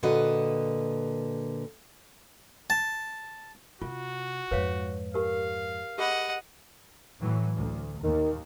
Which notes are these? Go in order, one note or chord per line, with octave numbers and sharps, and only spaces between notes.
A#2 D3 F#4 B4 D#5
A5
C3 F4 F#4
F2 G#2 B4 C#5 F5
G4 A#4 F5
G4 G#4 D#5 F#5 B5
A2 E3 F#3
D2
D#2 D#3